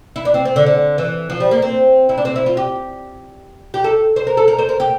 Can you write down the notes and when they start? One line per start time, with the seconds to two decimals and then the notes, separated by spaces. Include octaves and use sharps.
0.16 E4
0.25 D4
0.34 C4
0.45 C4
0.56 D3
0.66 D3
0.98 E3
1.30 F3
1.40 G3
1.51 A#3
1.62 C4
2.09 E4
2.18 D4
2.25 C4
2.36 E4
2.46 F4
2.57 G4
3.74 G4
3.84 A4
4.16 C5
4.27 A#4
4.37 A4
4.48 A#4
4.59 C5
4.69 A#4
4.80 G4